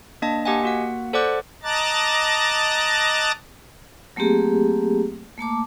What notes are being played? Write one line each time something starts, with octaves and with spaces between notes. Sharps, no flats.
A#3 D4 D#5 A5
A#3 G4 D#5 F#5 G#5
A#3 F#4 F#5
A4 C5 D5 F#5 D6 F#6
D#5 A5 A#5 D6 F#6 A6
F#3 A3 A#3 C4 G4 G#4
A3 A#3 A5 D6